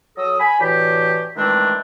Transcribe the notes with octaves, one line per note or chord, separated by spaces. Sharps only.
F#3 A4 D#6
G#5 B5
A2 D3 E3 F#4 G4
D#3 E3 G#3 A3 C4 D4